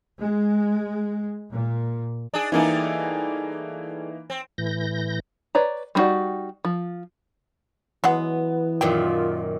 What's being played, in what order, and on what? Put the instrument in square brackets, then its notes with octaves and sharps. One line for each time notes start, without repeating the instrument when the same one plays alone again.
[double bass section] G#3
A#2
[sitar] D4 G#4
[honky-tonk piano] E3 A#3 D#4 [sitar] G3 A3 G#4
[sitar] C4
[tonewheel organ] A2 E3 G6 A#6
[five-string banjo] B4 C#5 D5 A#5
G3 C4 D#4 F#4 D5
F3
[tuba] E3 [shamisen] F#3 G#3 F#5 [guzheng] B3
[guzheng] F#2 A#2 D#3 [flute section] F4 [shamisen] G5